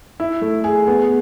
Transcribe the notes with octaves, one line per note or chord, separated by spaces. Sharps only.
E4
A3
G#4
B3